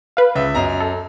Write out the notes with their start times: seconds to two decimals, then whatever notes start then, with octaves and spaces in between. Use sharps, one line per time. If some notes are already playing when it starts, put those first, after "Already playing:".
0.17 B4 F5
0.35 C#2 E5
0.55 F#2 D#5 A#5
0.80 A4